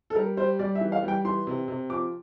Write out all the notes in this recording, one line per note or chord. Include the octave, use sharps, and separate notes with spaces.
A4
G3 A#4
G3 C5
G3 D5
E5
E3
F5
G3
G5
E3 C6
C3
C3
F3 D6